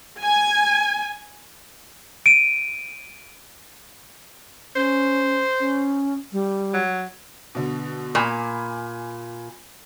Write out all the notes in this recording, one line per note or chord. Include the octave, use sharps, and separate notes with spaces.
G#5
D7 D#7
C#4 C5
C#4
G3
F#3
B2 D3
A#2 G#5 B5 D6